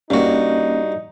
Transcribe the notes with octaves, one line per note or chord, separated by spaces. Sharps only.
G2 A#3 C#4 D#4 F#4